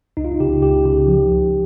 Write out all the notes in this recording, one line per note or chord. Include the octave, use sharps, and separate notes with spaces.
C#2 D#4
F4
D#4
C#3 G4
C#2 G4
C#3 G4
F3
C#2